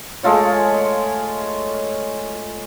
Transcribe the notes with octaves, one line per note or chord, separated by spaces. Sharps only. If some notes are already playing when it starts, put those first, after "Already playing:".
G#3 A3 F4 C#5